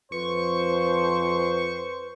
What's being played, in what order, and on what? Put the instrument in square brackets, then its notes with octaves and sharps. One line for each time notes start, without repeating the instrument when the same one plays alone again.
[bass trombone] F2 [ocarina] B4 [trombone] C5 [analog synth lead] C#6